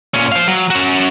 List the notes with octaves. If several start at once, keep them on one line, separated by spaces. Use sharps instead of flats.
A#2 C#4
C5 F5
F#3
C#4 F#4